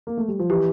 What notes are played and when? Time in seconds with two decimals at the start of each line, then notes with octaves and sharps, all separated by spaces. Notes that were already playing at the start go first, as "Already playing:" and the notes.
0.07 A#3
0.17 A3
0.28 G3
0.39 F3
0.50 E3 G4